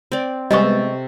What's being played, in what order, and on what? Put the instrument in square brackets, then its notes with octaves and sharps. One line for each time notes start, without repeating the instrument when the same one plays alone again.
[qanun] C4 D5
[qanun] C3 A4 A5 [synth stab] G3 G#3 B3 [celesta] D#5 C#6